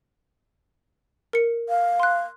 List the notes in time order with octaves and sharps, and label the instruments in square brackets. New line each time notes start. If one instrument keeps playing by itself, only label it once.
[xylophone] A#4 C#7
[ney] F5
[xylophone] C6 F#6